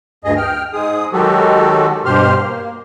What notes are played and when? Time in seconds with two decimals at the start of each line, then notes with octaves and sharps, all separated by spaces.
0.24 D2 G2 G#4 D#5
0.37 G5 F6
0.73 G#2 G#3 G#4 D#6
1.13 D#3 F#3 G#3 F#4 G4 A4
2.05 G2 B2 G4 C5 C6 F6
2.41 A#3